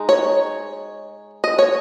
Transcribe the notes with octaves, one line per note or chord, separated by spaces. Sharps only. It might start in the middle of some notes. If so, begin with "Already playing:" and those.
Already playing: G#3 D#4
C#5
D#5
C#5